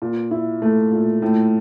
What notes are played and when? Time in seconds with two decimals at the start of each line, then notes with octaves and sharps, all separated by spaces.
0.02 A#2
0.31 E4
0.62 A3
0.92 A#2
1.22 A2